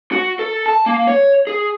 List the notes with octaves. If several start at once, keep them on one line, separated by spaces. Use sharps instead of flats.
F#4
A4
A5
A#3
C#5
G#4